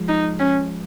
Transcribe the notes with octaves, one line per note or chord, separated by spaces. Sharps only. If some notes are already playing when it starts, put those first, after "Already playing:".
Already playing: F3 G#3
D#4
C#4